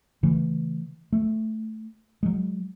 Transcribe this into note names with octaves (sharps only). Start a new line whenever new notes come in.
C#3 E3 A3
A3
F#3 G#3